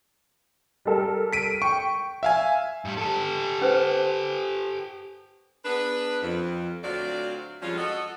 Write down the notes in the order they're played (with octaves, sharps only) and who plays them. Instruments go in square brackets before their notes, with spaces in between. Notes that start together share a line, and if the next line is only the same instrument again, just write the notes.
[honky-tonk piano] G3 A4 A#4
[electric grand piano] B6 D7 D#7
[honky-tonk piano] G5 [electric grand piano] C#6
[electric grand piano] E5 F5 G#5
[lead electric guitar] G2 G3
G4 A4
[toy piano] C#4 B4 C5
[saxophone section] B3 D4 G#4 B4
F2
D2 F#3 C4 F4 D5
F2 F3 G3 G#3 C#4 F4
F#4 A4 D#5